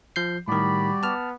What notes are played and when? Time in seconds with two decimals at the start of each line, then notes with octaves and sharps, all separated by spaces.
0.16 F3 G6 C7
0.48 A2 D#3 G3 F#4 G4 D5 B5
1.03 B3 A5 F6